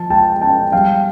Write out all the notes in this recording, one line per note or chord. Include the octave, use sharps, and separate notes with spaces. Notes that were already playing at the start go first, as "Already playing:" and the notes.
Already playing: F3 A5
G#3 G5 A5
C#4 G5 A5
G3 F5 G5